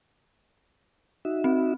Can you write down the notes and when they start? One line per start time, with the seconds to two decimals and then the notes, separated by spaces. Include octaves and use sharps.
1.25 D#4 F#4 E5
1.44 C4